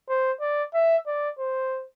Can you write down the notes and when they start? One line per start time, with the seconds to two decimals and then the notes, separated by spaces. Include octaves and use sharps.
0.09 C5
0.40 D5
0.74 E5
1.06 D5
1.39 C5